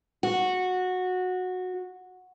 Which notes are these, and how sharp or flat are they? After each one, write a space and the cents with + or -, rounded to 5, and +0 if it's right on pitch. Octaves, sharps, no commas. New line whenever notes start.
F#4 -15